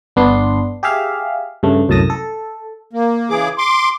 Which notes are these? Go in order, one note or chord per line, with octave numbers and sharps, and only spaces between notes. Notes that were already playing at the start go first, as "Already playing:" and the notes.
G1 B3 D4 C6
G4 G#4 E5 F5
G2 C#3 A3
C2 F#2 A2 A5 D#6 A#6
A4
A#3
C#3 E3 G#4 D6
C6 D6